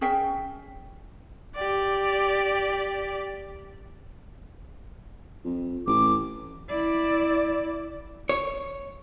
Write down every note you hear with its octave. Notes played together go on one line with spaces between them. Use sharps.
C#4 G#4 E5 G5
G4 D5
F2
A1 D6
E4 D5
C#5